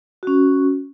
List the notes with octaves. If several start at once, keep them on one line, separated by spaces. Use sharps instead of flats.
C#4 F#4